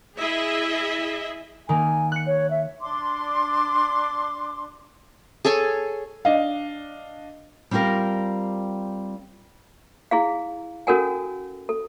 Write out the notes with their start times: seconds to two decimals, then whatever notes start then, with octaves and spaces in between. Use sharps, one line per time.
0.18 E4 G#4 D#5 E5
1.69 D#3 A#3 G#5
2.12 F#6 C#7
2.27 C#5
2.50 E5
2.81 D4 C6 D6
5.45 G#4 A4 C#5 G#5
6.25 D4 D#5 F5
7.71 G3 C4 F4 G4 A#4
10.11 E4 G#4 F5
10.87 C#4 F#4 A4 A#4 F#5 G#5
11.69 A4